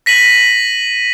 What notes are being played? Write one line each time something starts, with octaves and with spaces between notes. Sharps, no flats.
A#6 B6 D#7 F#7